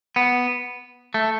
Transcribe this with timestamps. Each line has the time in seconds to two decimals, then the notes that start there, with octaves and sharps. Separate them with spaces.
0.16 B3
1.14 A3